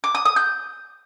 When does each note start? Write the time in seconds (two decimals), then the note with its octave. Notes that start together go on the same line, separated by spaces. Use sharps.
0.04 D6
0.15 D#6
0.25 D#6
0.36 G6